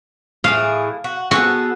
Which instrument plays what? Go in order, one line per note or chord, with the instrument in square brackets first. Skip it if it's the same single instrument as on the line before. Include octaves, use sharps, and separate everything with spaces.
[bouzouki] A2 E3 G#4 [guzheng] F5
[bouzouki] F#4
[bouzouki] B3 G#4 A4 [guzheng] F#4